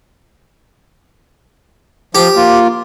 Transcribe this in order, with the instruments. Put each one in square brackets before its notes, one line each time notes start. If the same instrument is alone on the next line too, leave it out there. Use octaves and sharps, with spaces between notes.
[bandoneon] F3 [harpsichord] G4
[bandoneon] A#3 F4